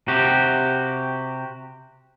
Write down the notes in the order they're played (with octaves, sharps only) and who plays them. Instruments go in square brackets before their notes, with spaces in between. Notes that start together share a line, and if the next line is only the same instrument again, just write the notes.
[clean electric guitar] C3 F#4 G4